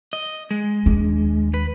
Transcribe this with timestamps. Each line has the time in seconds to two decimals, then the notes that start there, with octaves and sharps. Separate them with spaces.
0.13 D#5
0.51 G#3
0.86 D#2 D4
1.54 B4